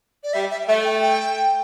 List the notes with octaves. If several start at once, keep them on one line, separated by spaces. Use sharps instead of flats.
D5
G3 E5
E5
A3 E5
G5
G5